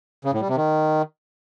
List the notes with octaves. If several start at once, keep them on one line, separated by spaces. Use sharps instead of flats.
C#3
A2
G3
C3
D#3